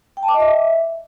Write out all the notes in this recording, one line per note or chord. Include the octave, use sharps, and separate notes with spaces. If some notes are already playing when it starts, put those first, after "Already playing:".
G5
A5
D6
D#5
E5